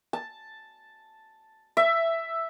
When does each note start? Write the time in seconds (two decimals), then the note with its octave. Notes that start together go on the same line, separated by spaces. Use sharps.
0.13 A5
1.77 E5